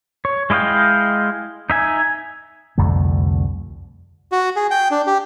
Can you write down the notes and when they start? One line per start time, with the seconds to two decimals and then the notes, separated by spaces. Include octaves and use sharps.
0.25 C#5
0.50 G#3 E4 D#5 F5 G5
1.70 D#4 E5 G#5
2.78 C2 F2 D3 A3
4.32 F#4
4.56 G#4
4.71 G5
4.91 D4
5.07 G4